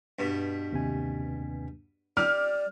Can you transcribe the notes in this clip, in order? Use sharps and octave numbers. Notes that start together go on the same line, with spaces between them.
G2 B2
D#2 C3 G#5
G3 D5 D6 F6